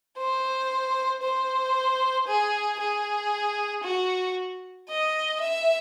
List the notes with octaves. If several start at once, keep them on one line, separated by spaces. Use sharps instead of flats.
C5
C5
G#4
G#4
F#4
D#5
E5